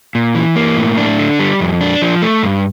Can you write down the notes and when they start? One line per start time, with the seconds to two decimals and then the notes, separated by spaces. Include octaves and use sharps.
0.15 A#2
0.35 E3
0.56 A#3
0.77 A2
0.97 D4
1.19 D3
1.39 G3
1.61 F2
1.81 D4
2.02 F3
2.22 A3
2.43 G2